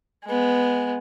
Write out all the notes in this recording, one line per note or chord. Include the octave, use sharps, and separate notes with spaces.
G#3 B3